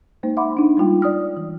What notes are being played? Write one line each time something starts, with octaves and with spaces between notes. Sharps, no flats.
G#3 A#3 D#4 C5
E5 F#5 B5 C6 D6
D4 D#4
G3 G#3 F4 G5
D5 D#6 F6
E3